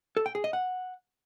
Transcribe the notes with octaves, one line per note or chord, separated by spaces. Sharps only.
A4
G5
G#4
D#5
F#5